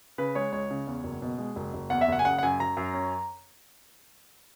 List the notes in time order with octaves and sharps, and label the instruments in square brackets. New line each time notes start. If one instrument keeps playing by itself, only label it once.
[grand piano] C#3 B4
G#3 C#5
C#2 C#5
C#3
E2
F#1
B2
G#3
F#1
F#1
E2 F#5
E5
F#1 F#5
G#5
C#3 F#5
F#5
F#2 G#5
F#2 A#5
F#2
C#4